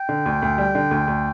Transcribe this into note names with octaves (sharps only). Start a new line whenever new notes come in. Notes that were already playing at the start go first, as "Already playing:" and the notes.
Already playing: G5
D3
D2
D2
G3
D3
D2
D2